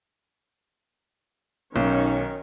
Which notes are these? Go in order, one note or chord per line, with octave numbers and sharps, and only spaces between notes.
B1 D#3 C#4